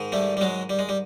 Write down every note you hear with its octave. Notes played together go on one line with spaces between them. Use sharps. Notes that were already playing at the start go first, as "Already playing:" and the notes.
Already playing: G#2 D#3
G3 A3
G3
F#3 G#3
G3
G#3
G3